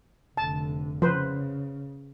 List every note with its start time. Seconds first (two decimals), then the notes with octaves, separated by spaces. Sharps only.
0.37 F1 D3 A5
1.02 C#3 F3 B4 C5